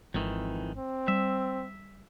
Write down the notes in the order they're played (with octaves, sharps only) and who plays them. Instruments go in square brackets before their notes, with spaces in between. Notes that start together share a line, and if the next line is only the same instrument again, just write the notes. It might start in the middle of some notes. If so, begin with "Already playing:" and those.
[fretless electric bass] G#1 [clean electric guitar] F2 D#3 E3
[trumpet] C4
[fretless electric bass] G3 [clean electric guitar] E5